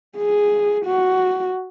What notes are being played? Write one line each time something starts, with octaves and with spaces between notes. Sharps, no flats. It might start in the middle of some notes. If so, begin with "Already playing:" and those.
G#4
F#4